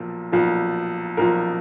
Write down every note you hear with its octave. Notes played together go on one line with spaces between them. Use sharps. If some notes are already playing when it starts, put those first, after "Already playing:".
Already playing: B1 A#2 F3
B1 A#2 F3
B1 A#2 F3 A#4